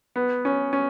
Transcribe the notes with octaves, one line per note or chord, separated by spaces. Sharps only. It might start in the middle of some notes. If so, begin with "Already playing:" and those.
B3
C#4
C#4